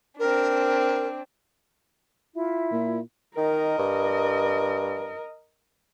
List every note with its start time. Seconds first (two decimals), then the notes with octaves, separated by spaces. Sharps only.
0.19 C4 D4 A#4
2.34 E4 F4 E5
2.71 A#2
3.37 D#3 A#4 D#5
3.78 G2